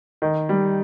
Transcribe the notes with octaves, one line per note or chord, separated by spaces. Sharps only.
D#3
G3